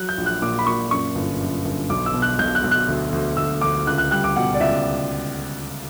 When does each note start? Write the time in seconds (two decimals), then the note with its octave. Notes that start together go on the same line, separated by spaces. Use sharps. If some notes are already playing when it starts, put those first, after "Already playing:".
Already playing: F#3 F#6
0.09 G6
0.18 A#1
0.26 F#6
0.42 A#2 D6
0.59 B5
0.67 A#2 C#6
0.91 F#2 C#6
1.15 G1
1.40 F#2
1.65 G1
1.90 B1 D6
2.06 E6
2.14 B2
2.22 F#6
2.39 B1 G6
2.55 F#6
2.64 B1
2.71 F#6
2.88 D2
3.13 D2
3.37 D2 E6
3.61 D2 D6
3.87 C#2 F#6
3.98 F#6
4.11 G3 F#6
4.24 D6
4.36 B2 F#5
4.54 D5
4.60 C#2 E5